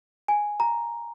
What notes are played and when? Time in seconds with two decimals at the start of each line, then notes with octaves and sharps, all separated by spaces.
0.28 G#5
0.60 A#5